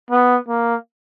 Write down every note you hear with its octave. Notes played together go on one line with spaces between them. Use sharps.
B3
A#3